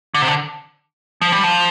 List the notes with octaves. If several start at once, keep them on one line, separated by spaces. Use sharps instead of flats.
D3
C3
D3
F3
G3
F3